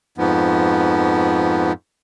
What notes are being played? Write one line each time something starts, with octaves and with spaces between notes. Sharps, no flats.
F2 G#2 F3 B3